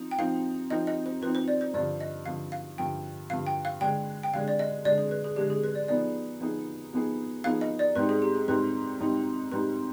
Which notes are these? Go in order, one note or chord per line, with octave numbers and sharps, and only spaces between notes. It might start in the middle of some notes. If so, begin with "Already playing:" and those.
Already playing: F3 C4 D#4
G5
F3 C4 D#4 F5
F3 C4 D#4 D#5
D#5
C5
F3 C4 D#4 B4
C5
D5
C5
G2 D3 F3 D5
D#5
G2 D3 F3 F5
F5
G2 D3 F3 G5
G2 D3 F3 F5
G5
F5
D3 G#3 D4 G5
G5
D3 G#3 D4 F5
D5
D#5
D3 G#3 D4 D5
G#4
B4
G#4
D3 G#3 D4 G4
G#4
B4
D5
F3 B3 D#4 G#4 D5
F3 B3 D#4 G#4
F3 B3 D#4 G#4
F3 B3 D#4 G#4 F5
D#5
D5
G#2 G3 C4 D#4 B4
G#4
G4
G#4
G#2 G3 C4 D#4 B4
G#2 G3 C4 D#4
G#2 G3 C4 D#4 B4